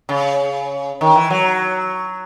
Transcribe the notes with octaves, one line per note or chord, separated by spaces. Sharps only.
C#3
D#3
E3
F#3